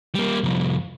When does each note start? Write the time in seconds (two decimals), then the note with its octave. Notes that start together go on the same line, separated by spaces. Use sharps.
0.15 G3 A#3
0.44 C2 F2